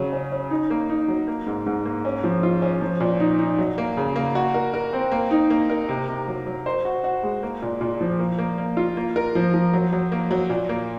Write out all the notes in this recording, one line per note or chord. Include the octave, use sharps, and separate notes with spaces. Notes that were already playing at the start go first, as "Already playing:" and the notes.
Already playing: C#3 F#3 C#4
C#4
C#4
D#4
A#3
D#4
F#3
A#3
G#2
G#2
A#3
C#4
F3
F4
C#4
F3
A#2
D#4
D#4
F#3
A#3
C#3
A#3
F#4
A#4
A#4
C4
A#3
D#4
A#3
A#4
C3
C3
F#3
F#3
C5
F#4
F#4
G#3
A#3
A#2
A#2
F3
A#3
A#3
A#3
F4
A#3
A#4
F3
F3
F#3
F#3
A#3
F#3
A#2
A#3